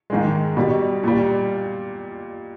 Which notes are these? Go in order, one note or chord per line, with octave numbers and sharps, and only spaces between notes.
G#2 D#3 G#3
B2 G3
A#2 G3